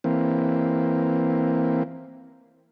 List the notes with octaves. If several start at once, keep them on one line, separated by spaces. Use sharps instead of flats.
E3 A#3 C4